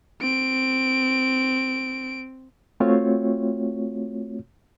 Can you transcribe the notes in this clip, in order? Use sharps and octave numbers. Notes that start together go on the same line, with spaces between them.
C4 D7
A3 C4 F4 F#4 C#5